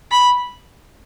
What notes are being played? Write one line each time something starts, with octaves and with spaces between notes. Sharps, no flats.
B5